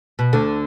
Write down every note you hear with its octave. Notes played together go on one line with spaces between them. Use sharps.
B2
D2 D3